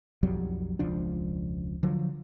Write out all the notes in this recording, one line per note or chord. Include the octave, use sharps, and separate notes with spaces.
B1 F2 F#3 G3
E1 C#2 F3 D4
D3 F3 F#3